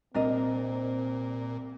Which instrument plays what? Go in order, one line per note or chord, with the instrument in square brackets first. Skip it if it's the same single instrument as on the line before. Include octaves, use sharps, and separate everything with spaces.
[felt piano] C2 [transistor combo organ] A#2 [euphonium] C4 [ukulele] D4 A#4 D#5